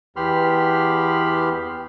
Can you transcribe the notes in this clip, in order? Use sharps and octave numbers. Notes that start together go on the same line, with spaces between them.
E2 B3 G4 B5 C6 F6